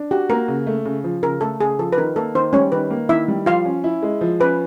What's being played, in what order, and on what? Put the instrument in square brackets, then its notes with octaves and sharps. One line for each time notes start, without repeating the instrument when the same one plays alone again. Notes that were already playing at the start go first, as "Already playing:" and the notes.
Already playing: [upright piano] D4
[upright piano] F#4 [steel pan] G4
[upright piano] A#3 [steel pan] A#4
[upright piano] C#3
A3
C#3
F3
[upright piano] C#3 [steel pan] A#4
[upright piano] A3 [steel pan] A4
[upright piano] C#3 [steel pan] G#4
[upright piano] F3 [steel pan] A4
[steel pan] B4
[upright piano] D#3 [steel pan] A#4
[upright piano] A#3 [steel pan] A4
[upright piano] D#3 [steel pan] C5
[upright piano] G3 [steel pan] C#4 C#5
[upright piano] D#3 [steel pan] B4
[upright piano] A#3
[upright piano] D#3 [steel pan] E4 E5
[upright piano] G3
[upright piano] F3 [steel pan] F4 F5
[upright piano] C#4
E4
G#3
F3
[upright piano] C#4 [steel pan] B4